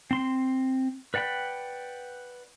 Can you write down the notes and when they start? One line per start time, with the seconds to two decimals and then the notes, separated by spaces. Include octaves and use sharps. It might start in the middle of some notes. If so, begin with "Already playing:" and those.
0.11 C4 C6
1.14 B4 D5 F#5 G5 B5